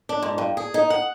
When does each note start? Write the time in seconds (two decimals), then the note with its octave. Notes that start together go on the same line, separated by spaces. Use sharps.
0.09 D4
0.22 G#2
0.38 G2
0.57 G#4
0.74 D#4
0.90 F#5